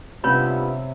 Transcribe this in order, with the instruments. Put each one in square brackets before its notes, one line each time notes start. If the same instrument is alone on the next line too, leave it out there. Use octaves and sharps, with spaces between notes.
[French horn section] G2 B3 F4 [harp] C3 C#4 E5 [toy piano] C#5 B5